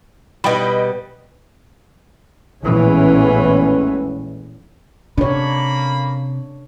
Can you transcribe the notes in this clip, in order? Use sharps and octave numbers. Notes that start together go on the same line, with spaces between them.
B2 G3 D#5 G5 B5
A#1 E2 A2 E3 G#3 C#4
C3 A#3 D4 C#5 B5